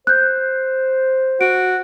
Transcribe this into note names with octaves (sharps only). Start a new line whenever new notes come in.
C5 F#6 G6
F#4 D7